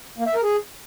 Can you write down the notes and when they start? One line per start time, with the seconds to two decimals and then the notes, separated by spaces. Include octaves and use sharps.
0.18 A#3
0.27 E5
0.35 A#4
0.43 G#4